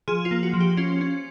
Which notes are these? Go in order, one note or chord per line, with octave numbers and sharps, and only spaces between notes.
F3 G#4
F4
A#3
F#4
F3
G4
C#4 F4
C#4